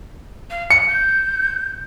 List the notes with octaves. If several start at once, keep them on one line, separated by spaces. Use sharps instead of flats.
F5
F#5 C#7
G6